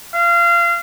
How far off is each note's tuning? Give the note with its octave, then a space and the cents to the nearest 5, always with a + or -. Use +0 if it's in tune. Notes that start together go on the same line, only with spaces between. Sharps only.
F5 -25